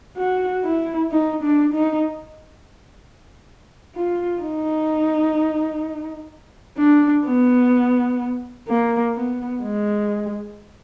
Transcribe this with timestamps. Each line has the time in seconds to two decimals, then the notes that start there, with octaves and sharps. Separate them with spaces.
0.17 F#4
0.64 E4
1.11 D#4
1.43 D4
1.74 D#4
3.95 F4
4.42 D#4
6.78 D4
7.25 B3
8.68 A#3
9.15 B3
9.62 G#3